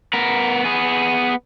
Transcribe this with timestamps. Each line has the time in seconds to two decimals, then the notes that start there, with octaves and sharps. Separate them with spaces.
0.13 B3 A#4
0.65 B3 G#4